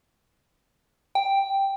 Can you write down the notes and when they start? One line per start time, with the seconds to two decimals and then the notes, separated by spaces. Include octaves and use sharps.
1.15 G5